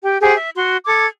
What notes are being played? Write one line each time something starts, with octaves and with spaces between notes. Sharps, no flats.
G4 G5
G4 G#4 C5 F#5
E5
F#4 C6
A4 D6 G#6